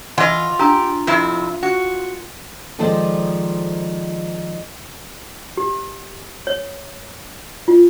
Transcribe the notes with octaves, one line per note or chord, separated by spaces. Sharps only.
E3 F4 D#5 F#5
D4 G4 A#5 E6
F2 C3 E4
F#4
D#3 F3 G#3 A4 C5 D5
G4
C#5
F4